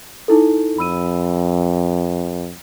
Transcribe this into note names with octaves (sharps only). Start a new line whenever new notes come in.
D#4 E4 A4
F2 B5 E6 D#7